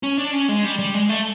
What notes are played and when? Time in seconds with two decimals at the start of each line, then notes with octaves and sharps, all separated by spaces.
0.03 C#4
0.18 D4
0.33 C#4
0.49 G#3
0.64 G3
0.79 G3
0.94 G#3
1.09 A3